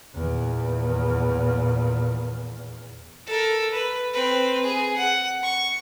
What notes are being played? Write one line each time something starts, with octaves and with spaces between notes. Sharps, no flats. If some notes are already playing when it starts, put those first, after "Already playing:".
E2 A#2
A4 A#4
B4
C4 B4
G#4
F#5
C#6